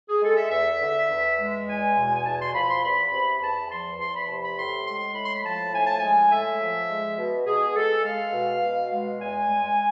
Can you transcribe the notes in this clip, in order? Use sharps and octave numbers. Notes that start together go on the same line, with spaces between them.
G#4
G#3 A4
E5
E2 E5
D3
E2
G#3
E2 G#5
B2
G#5
E2 A5
C6
F3 B5
C6
E2 B5
C3
E2 A5
F3 C6
E2 C6
B5
C3 A5
B5
A2 C6
G#3 C6
A2 B5
C6
B5
F3 A5
A2 G#5
A5
G#3 G#5
A2 E5
F3
G#3
B2
B2 G#4
G#3 A4
G#3 F5
B2
B2
G#3
E2 G#5
G#3